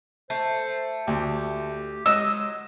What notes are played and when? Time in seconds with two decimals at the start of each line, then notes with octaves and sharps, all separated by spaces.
0.30 A3 C5
1.07 D2 G4
2.06 F#3 G#3 D#5 E6